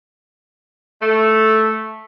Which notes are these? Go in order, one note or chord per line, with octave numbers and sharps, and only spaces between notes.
A3